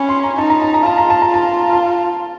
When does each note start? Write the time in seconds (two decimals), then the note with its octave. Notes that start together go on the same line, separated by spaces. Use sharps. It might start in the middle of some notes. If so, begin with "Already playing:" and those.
Already playing: C#4 B5
0.09 C6
0.24 A#5
0.38 D#4 A5
0.50 A#5
0.62 A5
0.74 A#5
0.83 F4 A5
0.98 A#5
1.10 A5
1.22 A#5
1.28 F4
1.34 A5
1.73 A5